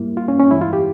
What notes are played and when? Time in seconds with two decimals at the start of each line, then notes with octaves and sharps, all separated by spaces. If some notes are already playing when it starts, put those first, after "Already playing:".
Already playing: G#2 G3 A#3 E4
0.17 F4
0.28 C#4
0.39 C#4
0.51 G2 E3 G#3 E4
0.61 F4
0.73 G4